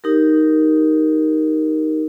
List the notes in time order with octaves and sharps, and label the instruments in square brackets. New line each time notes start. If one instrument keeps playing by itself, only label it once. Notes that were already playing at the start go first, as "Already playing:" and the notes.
[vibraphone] D#4 G4 A#4